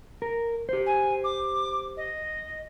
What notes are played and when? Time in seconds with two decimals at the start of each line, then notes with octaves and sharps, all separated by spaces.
0.22 A#4
0.69 G4 C5
0.86 G#5
1.24 D6
1.96 D#5